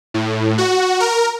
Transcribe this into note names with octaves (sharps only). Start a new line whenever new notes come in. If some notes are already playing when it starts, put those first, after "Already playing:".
A2
F#4
A#4